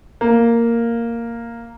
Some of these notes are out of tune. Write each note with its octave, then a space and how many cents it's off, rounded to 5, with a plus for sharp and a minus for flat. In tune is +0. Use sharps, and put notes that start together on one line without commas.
A#3 -5